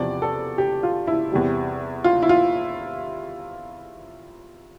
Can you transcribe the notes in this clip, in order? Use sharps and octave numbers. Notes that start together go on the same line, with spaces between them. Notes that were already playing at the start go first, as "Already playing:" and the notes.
Already playing: E2 C3 F3 D5
A4
G4
F4
E4
E2 C3 G3
F4
E4
F4